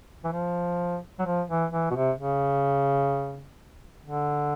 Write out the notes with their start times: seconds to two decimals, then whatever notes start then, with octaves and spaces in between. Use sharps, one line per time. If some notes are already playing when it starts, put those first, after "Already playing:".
0.24 E3
0.32 F3
1.19 F#3
1.26 F3
1.49 E3
1.72 E3
1.91 B2
1.95 C3
2.18 C#3
4.04 D3